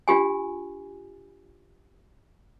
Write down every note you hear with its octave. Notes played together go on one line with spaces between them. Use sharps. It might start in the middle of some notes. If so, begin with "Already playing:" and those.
D4 F4 G4 G#5